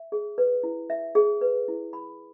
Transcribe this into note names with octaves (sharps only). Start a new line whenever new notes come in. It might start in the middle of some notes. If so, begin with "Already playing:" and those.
Already playing: E5
G#4
B4
E4
E5
G#4
B4
E4
B5